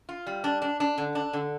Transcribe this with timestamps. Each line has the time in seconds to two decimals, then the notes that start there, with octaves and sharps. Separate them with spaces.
0.09 F4
0.27 G3
0.44 D4
0.62 D4
0.80 D4
0.98 D3
1.15 D4
1.33 D3